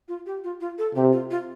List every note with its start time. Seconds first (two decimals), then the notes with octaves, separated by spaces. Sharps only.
0.08 F4
0.26 G4
0.44 F4
0.60 F4
0.78 A4
0.95 C3 G4
1.12 F4
1.31 F4